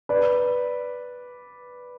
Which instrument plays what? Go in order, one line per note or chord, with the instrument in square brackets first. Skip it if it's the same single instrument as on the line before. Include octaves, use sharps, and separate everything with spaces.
[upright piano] B4 D5